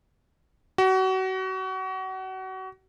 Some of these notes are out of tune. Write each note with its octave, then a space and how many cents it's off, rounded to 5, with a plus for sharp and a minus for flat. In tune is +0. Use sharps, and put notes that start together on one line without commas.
F#4 +30